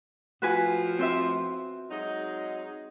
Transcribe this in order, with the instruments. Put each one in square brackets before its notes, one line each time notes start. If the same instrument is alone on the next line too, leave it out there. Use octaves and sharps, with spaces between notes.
[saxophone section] A2 F3 [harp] F#4 B4 G#5
[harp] C4 C5 E5
[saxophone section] F#3 G#3 D#4